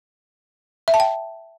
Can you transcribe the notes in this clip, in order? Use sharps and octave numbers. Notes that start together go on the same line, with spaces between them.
E5
A5
G5